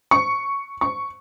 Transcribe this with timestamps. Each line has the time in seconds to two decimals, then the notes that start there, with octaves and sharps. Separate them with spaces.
0.11 C#6
0.81 C#6